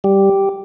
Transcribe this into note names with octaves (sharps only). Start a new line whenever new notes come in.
G3 G4